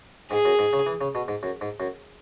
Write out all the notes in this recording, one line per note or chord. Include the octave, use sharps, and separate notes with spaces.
G#2 G#4
F#2
G#2
C#3
E3
C#3
B2
G#2
F#2
G#2
F#2